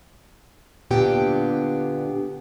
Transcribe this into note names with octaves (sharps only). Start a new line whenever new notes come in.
A#2 D3 B3 D4 G4 G5